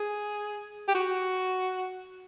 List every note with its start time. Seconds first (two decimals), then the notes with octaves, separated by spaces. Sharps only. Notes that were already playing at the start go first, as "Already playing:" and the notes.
Already playing: G#4
0.89 G4
0.95 F#4